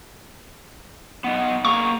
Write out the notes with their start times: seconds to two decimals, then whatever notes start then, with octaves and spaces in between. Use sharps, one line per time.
1.24 B3 D#4
1.65 A#3 G#4 A#5 C#6